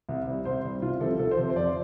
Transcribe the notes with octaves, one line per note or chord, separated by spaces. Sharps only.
C2
C3 G3
C2 C5
C3 G3
C2 F4
C3 F3 A4
C2 A4
C5
C3 F3
C5
F2 D5